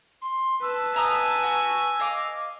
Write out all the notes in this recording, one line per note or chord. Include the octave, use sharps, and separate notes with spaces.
C6
B4 A5 E6
E5 G#5 A#5 D#6
F#4
D#5 F5 D6